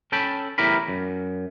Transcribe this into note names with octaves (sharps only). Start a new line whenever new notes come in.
C#4 A4 G5 A5 B5
E2 A2 E4 G4 A#4 B5
F#2